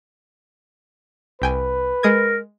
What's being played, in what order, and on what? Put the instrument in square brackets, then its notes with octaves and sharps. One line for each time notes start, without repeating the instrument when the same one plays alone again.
[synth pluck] C2 G5 G#5 [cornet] B4
[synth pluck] G#3 D#6 G#6 [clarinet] A#4